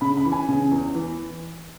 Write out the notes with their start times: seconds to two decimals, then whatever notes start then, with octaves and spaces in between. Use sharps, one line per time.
0.01 C#3 B5
0.17 B5
0.25 E3
0.32 G#5
0.49 C#3
0.71 E2
0.95 E3